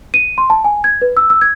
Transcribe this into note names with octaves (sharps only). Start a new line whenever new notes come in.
D#7
C6
A5
G#5
G#6
B4
E6
E6
G#6